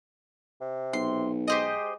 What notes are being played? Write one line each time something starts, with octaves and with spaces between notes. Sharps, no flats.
C3
B1 C6
G#3 G4 C5 D#5